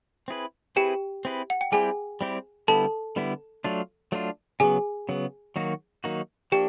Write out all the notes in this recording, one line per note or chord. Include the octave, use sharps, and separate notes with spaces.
C4 E4 G#4 B4
C4 E4 G4 G#4 B4 G5
C4 E4 G#4 B4
F#5
G5
G3 C4 E4 G4 G#4 G#5
G3 C4 E4 G4
D3 G3 B3 E4 A4 A5
D3 G3 B3 E4
F#3 A3 D4 F4
F#3 A3 D4 F4
C#3 F#3 B3 G#4 G#5
C#3 F#3 B3
D#3 F#3 A#3 D#4 F#4
D#3 F#3 A#3 D#4 F#4
F3 A#3 D4 G4 G5